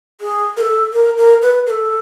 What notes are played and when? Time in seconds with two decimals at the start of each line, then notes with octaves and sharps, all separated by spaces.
0.21 G#4
0.57 A#4
0.61 A4
0.93 A#4
1.17 A#4
1.42 B4
1.66 A#4
1.70 A4